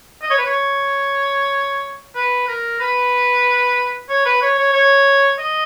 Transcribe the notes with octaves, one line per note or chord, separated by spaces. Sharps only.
D#5
C#5
B4
C#5
B4
A#4
B4
C#5
B4
C#5
C#5
C#5
D#5